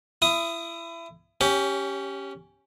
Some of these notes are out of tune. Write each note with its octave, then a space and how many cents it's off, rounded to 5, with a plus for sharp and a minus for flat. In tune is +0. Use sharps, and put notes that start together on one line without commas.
E4 +25 D#6 +0
C#4 +0 G4 +0 C#5 +30